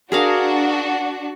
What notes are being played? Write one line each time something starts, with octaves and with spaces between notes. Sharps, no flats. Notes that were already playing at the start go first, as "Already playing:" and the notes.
D4 F#4 G#4 A#4 F5